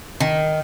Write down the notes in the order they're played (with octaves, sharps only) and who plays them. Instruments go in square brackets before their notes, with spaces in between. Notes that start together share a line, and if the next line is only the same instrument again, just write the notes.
[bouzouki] D#3